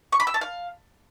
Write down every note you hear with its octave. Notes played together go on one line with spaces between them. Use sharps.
C#6
B5
E6
A5
F5